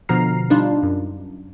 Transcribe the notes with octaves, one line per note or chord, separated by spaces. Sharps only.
B2 D3 F3 A#5 F6 C7
G3 D4 D#4 F4
F#2